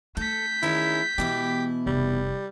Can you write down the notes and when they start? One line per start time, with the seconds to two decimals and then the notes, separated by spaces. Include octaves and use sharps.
0.17 A3 A4 G6 B6
0.63 D#3 C#4 E4 G#4
1.18 B2 E3 G#3 E4 G4
1.86 F1 G3